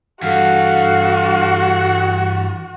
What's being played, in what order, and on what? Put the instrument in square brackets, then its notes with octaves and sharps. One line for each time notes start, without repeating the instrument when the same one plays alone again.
[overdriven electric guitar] G2 [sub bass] E3 [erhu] F#4 [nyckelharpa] A4 F5